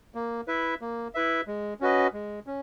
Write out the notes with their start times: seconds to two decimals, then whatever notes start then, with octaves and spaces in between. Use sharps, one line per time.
0.15 A#3
0.48 E4 B4 E5
0.81 A#3
1.15 E4 B4 E5
1.47 G#3
1.80 C#4 F#4 B4 D#5
2.13 G#3
2.47 C#4